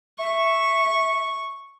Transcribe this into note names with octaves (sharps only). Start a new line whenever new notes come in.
E5 C#6